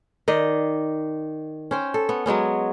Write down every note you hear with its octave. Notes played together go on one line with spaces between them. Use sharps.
D#3 D5 D#5
C#4 C5 G5
A4
B3
F#3 G#3 B3 C#4